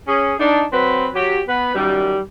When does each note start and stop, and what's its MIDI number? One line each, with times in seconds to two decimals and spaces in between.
0.08 0.34 61
0.08 0.34 68
0.39 0.64 62
0.39 0.64 63
0.72 1.08 54
0.72 1.08 60
0.72 1.08 71
1.15 1.41 54
1.15 1.41 67
1.48 1.74 59
1.48 1.74 71
1.75 2.19 42
1.75 2.19 51
1.75 2.19 55